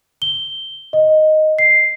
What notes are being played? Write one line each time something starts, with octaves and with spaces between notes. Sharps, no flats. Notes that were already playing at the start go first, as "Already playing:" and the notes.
G7
D#5
C7